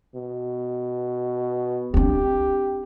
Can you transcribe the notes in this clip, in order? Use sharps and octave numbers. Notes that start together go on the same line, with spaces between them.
B2
C4 D4 G4